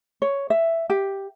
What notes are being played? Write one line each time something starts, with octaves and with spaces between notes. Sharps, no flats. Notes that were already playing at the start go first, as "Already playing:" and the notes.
C#5
E5
G4